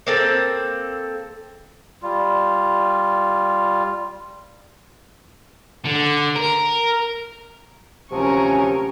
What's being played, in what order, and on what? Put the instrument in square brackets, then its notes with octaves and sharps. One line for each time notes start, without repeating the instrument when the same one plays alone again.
[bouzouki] A#3 C4 A4
[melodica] G3 F4
[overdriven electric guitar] D3
A#4
[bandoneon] D2 F3 F#3 [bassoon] C3 [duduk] C#4 [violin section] A#4 G#5 C#6